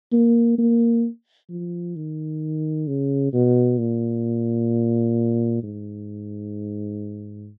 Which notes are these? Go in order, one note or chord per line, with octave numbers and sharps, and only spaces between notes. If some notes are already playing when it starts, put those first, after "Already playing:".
A#3
A#3
F3
D#3
C#3
B2
A#2
G#2